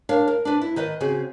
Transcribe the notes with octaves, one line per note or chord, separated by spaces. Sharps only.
D4 A#4 C#5 F5
A#4
D4 B4
E4
D#3 B4 D#5
C#3 C4 F#4 G#4